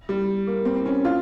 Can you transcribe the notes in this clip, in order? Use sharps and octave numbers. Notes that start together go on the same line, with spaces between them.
G3
A#3
C4
C4
C#4
F4